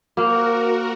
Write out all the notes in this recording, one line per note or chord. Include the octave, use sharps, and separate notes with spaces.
A#3 F#4 A#4 C5 F5